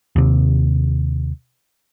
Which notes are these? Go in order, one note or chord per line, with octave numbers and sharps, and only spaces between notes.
D#2 C3